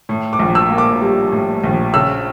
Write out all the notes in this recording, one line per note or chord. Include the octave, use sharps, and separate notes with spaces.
A2
D6
A#1
E6
A#3
D6
G3
A2
A#1
C#3 E6